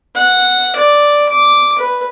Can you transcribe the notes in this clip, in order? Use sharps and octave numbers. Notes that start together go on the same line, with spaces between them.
F#5
D5
D6
B4